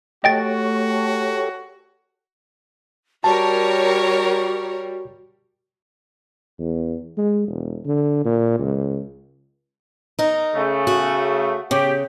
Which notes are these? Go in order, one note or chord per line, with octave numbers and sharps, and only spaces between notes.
A3 F#4 G4 A4 C#5 D#5 G5 A6
G3 F#4 A#4 C#5 A5
E2
G#3
E1
D3
A#2
C#2
D#4 A#4
C#3 A3
F#4
C#3 G4